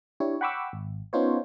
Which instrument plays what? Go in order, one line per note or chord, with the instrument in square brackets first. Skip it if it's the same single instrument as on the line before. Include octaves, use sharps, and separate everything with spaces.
[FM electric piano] D4 E4 G4 C#5
F#5 G5 B5 C#6 D6 E6
G#1
B3 C#4 D#4 F4 C5 C#5